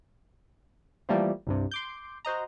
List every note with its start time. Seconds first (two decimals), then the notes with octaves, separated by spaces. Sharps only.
1.09 E3 F3 G3 A3 A#3 C4
1.47 C2 G2 C3
1.71 C6 D6 G6
2.25 F#4 C5 D#5 A#5